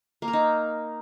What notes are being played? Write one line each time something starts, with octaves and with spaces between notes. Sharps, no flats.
A#3
A#4
D#4